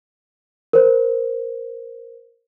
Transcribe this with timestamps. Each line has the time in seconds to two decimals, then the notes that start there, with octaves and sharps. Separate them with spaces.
0.73 A#4 C5